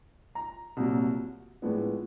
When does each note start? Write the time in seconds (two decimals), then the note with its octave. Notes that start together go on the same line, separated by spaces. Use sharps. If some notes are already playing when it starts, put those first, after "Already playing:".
0.35 A#5
0.77 C2 A#2 F#3
1.62 A2 F3 G#3 B3 D4